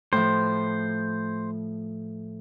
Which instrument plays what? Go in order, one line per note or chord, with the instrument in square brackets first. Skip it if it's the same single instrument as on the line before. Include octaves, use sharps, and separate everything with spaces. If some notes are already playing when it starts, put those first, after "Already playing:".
[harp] A2 F3 [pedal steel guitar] C5